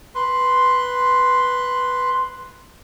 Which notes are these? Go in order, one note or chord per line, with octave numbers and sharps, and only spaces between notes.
B4 C6